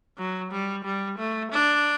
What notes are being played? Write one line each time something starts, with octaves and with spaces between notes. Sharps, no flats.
F#3
G3
G3
A3
D4